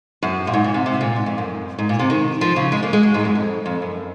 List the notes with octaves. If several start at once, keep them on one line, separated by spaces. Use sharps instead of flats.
F#2
A#2
G#2
A#2
C3
C3
A#2
G#2
F2
F#2
G#2
A#2
C3
D#3
F3
C#3
G#3
A#3
G#3
F#3
G#2
F#2
F2
F2
F#2